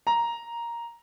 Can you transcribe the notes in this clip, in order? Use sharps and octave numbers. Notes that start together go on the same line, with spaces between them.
A#5